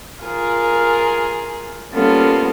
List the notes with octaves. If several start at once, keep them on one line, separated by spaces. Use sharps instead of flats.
F4 G#4 A#4
G3 A#3 B3 C#4 F4 A4